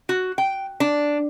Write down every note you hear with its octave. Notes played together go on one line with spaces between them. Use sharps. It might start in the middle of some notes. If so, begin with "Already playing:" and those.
F#4
G5
D4